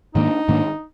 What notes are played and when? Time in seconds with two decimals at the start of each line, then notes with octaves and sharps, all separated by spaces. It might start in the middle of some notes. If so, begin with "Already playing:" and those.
0.15 G#2 D#3 A#3 D4 D#4
0.48 G#2 D#3 A#3 D4